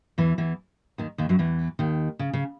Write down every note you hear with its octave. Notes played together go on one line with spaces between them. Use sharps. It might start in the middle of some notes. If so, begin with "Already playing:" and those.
E2 E3
E2 E3
D#2 D#3
D#2 D#3
F#2 F#3
E2 E3
D#2 D#3
C#3
C#3